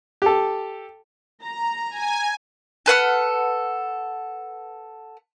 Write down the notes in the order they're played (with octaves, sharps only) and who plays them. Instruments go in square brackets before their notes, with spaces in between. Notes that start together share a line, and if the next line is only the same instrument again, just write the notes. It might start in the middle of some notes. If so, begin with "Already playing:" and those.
[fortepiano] G4 A4
[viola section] A#5
[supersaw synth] G#5
[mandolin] A4 B4 F#5 F6